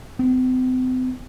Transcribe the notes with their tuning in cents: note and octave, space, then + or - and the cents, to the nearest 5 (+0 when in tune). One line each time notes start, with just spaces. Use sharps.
C4 -40